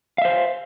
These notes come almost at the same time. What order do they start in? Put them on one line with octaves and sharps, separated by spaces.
F5 E5 C5